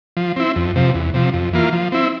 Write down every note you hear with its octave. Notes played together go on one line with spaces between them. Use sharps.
F3
C4 E4
F2
C3 F3
E2
C3 F3
F2
E3 A#3 F4
F3
C4 E4